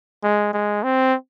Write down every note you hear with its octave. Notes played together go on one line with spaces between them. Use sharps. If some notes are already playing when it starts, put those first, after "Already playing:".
G#3
G#3
C4